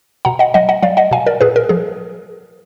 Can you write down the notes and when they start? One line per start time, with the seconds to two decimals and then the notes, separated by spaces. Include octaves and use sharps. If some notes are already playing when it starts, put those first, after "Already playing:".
0.25 B2 F#5 A#5
0.39 D#5 F#5
0.54 F#3 D#5 F#5
0.69 D#5 F#5
0.83 F#3 D5 F5
0.97 D#5 F#5
1.11 B2 F5 G#5
1.26 A#4 D5
1.41 A#2 G#4 B4
1.56 A#4
1.69 F3 G#4